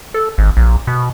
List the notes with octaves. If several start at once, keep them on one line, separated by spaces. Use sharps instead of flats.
A4
G#1
A#1
B2